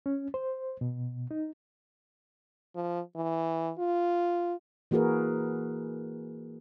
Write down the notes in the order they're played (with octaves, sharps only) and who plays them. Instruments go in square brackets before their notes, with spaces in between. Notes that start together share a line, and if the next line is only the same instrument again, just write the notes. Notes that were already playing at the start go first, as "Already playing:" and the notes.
[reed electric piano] C#4
C5
B2
D#4
[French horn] F3
E3
F4
[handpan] E3 A#3 F#4 G#4 A#4 B4